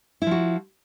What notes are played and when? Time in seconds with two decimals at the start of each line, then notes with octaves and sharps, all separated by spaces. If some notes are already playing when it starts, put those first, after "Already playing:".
0.22 E4
0.27 F3
0.31 F#4